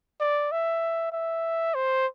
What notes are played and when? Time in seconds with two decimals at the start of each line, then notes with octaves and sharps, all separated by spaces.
0.20 D5
0.51 E5
1.12 E5
1.75 C5